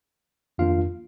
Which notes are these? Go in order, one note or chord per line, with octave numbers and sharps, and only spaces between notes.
F2 D#3 A#3 D4 F4 F5